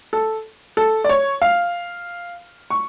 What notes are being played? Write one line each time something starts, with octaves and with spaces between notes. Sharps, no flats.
A4
A4
D5
C#5
F5
C#6